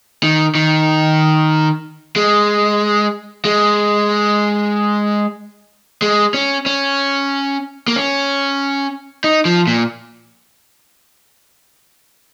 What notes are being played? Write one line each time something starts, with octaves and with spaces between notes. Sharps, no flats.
D#3
D#3
G#3
G#3
G#3
C#4
C#4
A#3
C#4
D#4
F3
A#2